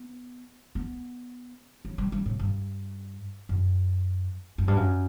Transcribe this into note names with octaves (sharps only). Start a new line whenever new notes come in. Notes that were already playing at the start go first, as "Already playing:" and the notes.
Already playing: B3
B3
F#3
G3
G3
A2
G2
F#2
F#2
G2
F#2